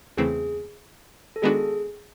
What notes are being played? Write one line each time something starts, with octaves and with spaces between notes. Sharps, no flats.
E2 C#3 E3 A3 C4 G#4
A4
D#3 G#3 B3 D4 F#4 G#4